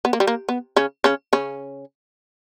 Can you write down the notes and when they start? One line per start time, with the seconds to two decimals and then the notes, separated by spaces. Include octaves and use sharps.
0.05 B3
0.13 A#3
0.20 G3
0.27 A#3
0.49 B3
0.76 C#3 C#4
1.04 C#3 C#4
1.33 C#3 C#4